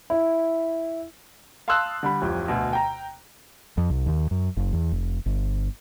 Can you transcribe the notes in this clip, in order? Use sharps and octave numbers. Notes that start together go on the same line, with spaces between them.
E4
F5 A5 C6 D#6 E6 F#6
D3 G3 B5
D1 F2 G4
D2 B2
G5 A#5
F2
C2
D#2
F#2
F#1
E2
F1
G1